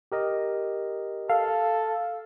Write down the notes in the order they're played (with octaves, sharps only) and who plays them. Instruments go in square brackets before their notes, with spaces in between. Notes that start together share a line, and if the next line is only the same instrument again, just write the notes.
[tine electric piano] G4 A#4 D#5
[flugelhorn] A4 [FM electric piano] F5